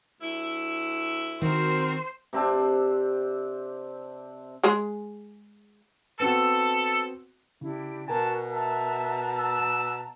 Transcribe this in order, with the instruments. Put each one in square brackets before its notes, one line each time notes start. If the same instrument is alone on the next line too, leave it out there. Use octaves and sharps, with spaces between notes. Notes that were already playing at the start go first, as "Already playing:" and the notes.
[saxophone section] D2 E4
[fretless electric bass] D#3 [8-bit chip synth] C4 F#4 A#4 [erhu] C5
[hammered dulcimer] C3 C4 D4
[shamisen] G#3 G#4
[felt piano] B3 C4 F#4 [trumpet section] A4
[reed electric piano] C#3 [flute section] D4 E4 G4
[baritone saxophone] B2 [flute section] F#4 [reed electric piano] A#4 G#5 [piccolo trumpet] A5
[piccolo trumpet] E5 [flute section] A5 A#5
[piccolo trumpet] E6